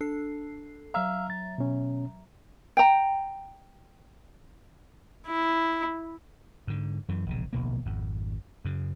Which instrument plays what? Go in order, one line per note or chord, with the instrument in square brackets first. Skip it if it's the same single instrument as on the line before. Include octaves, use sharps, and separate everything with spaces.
[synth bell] D4 A4 C7
[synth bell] F#3 E5 A#5 [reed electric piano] F5 E6 F6
[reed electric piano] A6
B2 C#4
[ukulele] G5 A#5
[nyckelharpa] E4
[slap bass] G#2 D3
F#2 E3
E1 A#1 C#3
D1 A#1 B2 A#3
G#1 F2
F#2 C#3